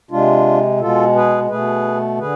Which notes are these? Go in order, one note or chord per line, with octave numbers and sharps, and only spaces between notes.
C3 G#3 D4 F4
B2 G#3 F4 A4
G#4 B4
B2 A3 G#4 B4
D3 G#4 B4